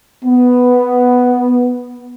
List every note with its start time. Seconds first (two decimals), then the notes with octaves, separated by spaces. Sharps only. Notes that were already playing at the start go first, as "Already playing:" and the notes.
0.24 B3